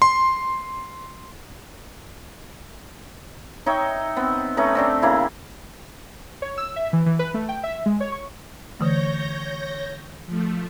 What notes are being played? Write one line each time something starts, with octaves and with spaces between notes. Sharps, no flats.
C6
D#4 C#5 E5 G5
B3 C4
A3 C#4 D#4 B4
C4 D4 G4
C#3 A#3 E4
C#5
E6
E5
E3
E3
B4
A3
G5
E5
G#3
C#5
C#6
D3 E3 A3 C#5 G6 A#6
F3 A3